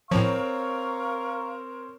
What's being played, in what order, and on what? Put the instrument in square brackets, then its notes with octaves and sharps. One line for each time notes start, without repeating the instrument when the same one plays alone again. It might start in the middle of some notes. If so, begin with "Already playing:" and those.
[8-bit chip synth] A2 F3 [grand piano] C4 C#5 [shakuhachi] A#4 [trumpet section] F5 A#5 C#6